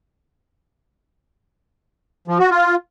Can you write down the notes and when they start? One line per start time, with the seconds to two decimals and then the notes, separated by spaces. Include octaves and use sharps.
2.28 F3
2.39 F#4
2.51 F4